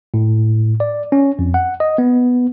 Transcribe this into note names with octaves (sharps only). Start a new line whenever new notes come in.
A2
D5
C#4
F2
F#5
D#5
B3